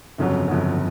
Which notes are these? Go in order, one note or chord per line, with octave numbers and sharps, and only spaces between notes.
G1 F2 C#3 F#3
G1 F2 C#3 F#3